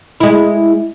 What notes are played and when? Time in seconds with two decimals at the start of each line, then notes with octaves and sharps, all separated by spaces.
0.20 G#3 E4